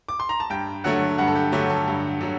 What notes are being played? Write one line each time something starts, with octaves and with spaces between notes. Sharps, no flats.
D6
C6
A#5
A5
G2 G5
D3 F#3 A3 F#5
G2 F#5
A4
G4
D3 F#3 A3 G4
A4
G2
D3 F#3